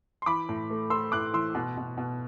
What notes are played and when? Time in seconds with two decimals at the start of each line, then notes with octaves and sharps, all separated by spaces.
0.22 C6
0.26 E3 B5 D6
0.49 A2
0.70 A3
0.90 A3 C6 E6
1.12 A2 D6 F#6
1.33 E3 C6 E6
1.55 B2
1.77 B2
1.98 B2